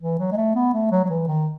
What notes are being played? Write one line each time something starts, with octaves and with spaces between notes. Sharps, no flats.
E3
F#3
G#3
A3
B3
A3
F#3
F#3
E3
D#3